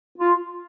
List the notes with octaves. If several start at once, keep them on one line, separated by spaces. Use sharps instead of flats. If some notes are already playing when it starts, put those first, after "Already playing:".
F4